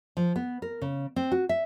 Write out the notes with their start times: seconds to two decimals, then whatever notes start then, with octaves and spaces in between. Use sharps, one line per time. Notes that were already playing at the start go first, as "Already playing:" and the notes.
0.17 F3
0.36 B3
0.62 A#4
0.82 C#3
1.16 C4
1.32 F#4
1.49 E5